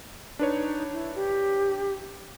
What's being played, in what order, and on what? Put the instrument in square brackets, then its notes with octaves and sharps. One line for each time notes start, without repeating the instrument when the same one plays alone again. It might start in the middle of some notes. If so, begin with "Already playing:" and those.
[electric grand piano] D4 B4 C#5 [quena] D#4
[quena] E4
G4